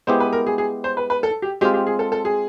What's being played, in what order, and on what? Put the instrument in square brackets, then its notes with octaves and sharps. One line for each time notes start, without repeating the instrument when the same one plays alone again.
[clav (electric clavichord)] G#3 B3 E4 G4 [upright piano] C5
[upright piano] B4
A#4
G#4
G#4
C5
B4
B4
A4
G4
[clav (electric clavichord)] G#3 C4 F4 [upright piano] G4
[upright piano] G4
G#4
A4
A4
G#4